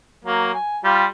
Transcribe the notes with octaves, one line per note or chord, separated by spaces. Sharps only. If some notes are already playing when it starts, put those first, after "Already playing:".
F#3 A#3
G#5
G3 F4 G4